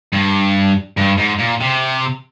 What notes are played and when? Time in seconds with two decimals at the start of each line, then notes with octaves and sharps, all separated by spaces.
0.12 G2
0.97 G2
1.17 G#2
1.38 A#2
1.60 C3